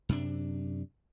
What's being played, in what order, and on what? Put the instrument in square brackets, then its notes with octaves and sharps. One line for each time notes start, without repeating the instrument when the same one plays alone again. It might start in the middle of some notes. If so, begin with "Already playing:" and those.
[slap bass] F#2 C3 D4